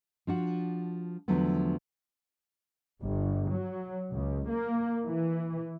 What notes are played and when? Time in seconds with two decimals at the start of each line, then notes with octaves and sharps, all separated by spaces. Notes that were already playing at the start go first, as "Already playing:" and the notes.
0.27 F3 D4 F#4
1.28 E2 D3 F3 F#3 A3 B3
3.03 G1
3.52 F#3
4.12 C#2
4.49 A#3
5.05 E3